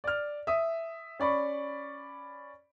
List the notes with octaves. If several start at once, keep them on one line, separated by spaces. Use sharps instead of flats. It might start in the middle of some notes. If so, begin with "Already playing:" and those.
D5 F6
E5 D#6
C#4 D5 B5 C#6